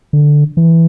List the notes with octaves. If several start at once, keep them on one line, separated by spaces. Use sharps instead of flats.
D3
E3